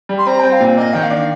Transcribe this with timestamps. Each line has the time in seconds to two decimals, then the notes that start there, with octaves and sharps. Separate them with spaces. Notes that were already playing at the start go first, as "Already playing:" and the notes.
0.09 G3
0.18 C6
0.27 C4 A#5
0.39 C4 G5
0.52 F5
0.60 A#2
0.77 A#3 D#5
0.93 D#3 G5
1.03 F5
1.10 D4